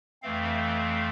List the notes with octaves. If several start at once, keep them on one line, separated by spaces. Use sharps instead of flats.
F2 E3 A3 C4 F5